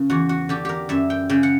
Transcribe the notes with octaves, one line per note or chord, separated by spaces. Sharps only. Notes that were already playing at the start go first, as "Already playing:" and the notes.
Already playing: C#3 A#4
E2 F#4
F#4
D3 G4
G4 A#4
F#2 E5
G5
C#3 G5
F#5